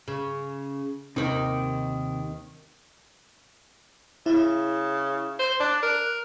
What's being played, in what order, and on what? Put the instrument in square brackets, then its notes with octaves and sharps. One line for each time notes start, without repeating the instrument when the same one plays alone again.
[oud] C#3
[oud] D#2 D#3 D#4 [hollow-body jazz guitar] C3
[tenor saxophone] C#3 [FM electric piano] E4
[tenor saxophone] C5
[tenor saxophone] D4 [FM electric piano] F#6
[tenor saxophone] A#4